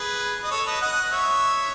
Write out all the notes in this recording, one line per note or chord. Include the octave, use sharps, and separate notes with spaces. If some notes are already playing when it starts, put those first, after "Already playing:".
Already playing: G#4 B4
D#5
A4 C#5
B4 D#5
D#5 F#5
C#5 E5